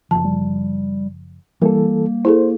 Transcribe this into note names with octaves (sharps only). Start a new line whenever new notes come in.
F#1 C2 F3 A5
G3
E3 G3 A#3 A4 A#4
E4 G#4 A4 C5